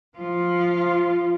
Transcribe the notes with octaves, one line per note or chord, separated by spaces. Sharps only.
F3 F4